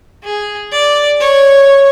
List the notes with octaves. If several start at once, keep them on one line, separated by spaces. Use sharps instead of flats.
G#4
D5
C#5